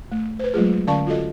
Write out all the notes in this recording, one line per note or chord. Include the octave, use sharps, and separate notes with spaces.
A3
B4 C5
F#3 G#3 A3 F4 G#4
D3 C#4 D5 F5 A5 C#6
F4 F#4 A4 D#5